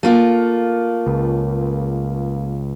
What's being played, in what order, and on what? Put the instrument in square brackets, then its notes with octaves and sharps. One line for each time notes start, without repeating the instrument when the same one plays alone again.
[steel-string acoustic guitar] A3 A#3 F4
[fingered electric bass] C#2